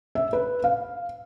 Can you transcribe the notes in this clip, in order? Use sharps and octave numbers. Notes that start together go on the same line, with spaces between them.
E5
B4
F5